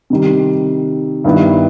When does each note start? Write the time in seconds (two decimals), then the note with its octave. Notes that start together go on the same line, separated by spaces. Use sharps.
0.10 C3 D#3 G3
1.24 G2 D#3 G3 B3 E4